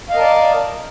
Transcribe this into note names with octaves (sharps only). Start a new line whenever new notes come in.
A#4 D5 D#5 F5 A5